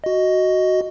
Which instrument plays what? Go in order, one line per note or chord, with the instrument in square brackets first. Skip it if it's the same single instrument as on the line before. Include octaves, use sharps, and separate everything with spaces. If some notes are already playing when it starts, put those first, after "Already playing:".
[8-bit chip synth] F#4 D#5